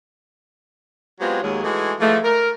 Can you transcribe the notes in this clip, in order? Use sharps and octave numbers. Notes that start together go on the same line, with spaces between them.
F#3 G#3 B3 C4 F4 G4
D#2 F#3 G#3
E3 G#3 A3 D#4 F#4 G#4
E3 F3 G#3 A3
A#4